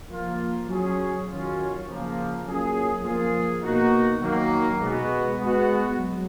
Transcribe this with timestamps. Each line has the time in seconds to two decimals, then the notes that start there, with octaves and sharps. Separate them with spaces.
0.10 F3 A#3 F4
0.68 F#3 C#4 G#4
1.27 D#3 F#3 C#4 F4
1.86 C#3 F3 A#3
2.44 F#3 A#3 C#4 F4 G#4
3.03 F3 A#3 F4 G#4
3.63 B2 A#3 D#4 F#4
4.22 D#3 F#3 A#3
4.80 B2 G#3 B3 F#4
5.38 G#3 B3 F#4
5.98 F#3